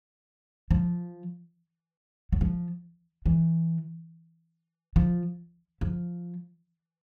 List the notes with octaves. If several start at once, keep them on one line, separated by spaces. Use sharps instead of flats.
F3
F#3
F3
E3
F3
F3